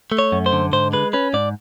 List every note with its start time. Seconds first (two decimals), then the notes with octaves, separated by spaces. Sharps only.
0.12 A3
0.19 C#5
0.32 F#2
0.46 C5
0.53 D3
0.73 G#2 C5
0.93 G#3 B4
1.13 C#4 B4
1.34 G#2 D5